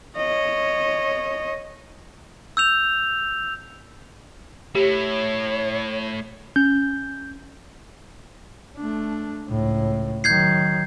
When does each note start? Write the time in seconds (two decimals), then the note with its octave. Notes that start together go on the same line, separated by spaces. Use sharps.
0.17 C#5 D#5
2.57 E6 G6 F7
4.75 A2 E4 G4 C#5
6.56 C#4 G6
8.77 A3 D4
9.47 C#2 A2
10.24 D#3 F#3 G6 G#6 C7